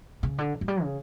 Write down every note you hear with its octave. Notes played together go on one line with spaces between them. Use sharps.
C#3
D3
F#3
G3
C#3